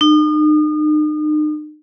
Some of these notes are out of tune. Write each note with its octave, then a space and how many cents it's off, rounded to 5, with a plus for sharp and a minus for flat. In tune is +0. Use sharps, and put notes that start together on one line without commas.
D#4 -40